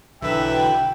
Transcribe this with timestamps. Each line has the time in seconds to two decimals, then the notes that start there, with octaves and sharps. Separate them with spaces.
0.22 B1 D3 E3 F#3 B4 E5 G5